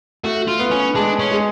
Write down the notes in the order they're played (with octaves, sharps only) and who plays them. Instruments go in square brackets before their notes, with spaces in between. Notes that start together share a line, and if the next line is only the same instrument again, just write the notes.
[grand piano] A3 [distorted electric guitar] F#4
[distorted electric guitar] F4
[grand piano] B3
[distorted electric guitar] C#4
[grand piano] G#3 [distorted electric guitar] D4
[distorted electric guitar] C#4
[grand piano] G#3